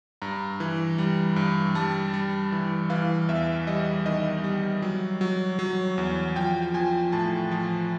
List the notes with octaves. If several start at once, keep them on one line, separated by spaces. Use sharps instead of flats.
G2 A#5
E3
G3
G2
G3 A5
G3
E3
E3 F5
E2 E5
G3 D#5
D#3 D#5
G3
F#3
F#3
F#3
E2
F3 G5
F3 G#5
A2 A5
F3